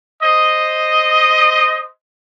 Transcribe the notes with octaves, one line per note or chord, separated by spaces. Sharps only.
C5 D#5